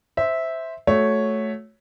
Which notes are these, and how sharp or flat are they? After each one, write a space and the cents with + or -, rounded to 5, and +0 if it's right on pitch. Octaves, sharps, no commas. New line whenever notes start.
C5 +0 E5 -10
A3 -10 F#4 -10 C#5 +0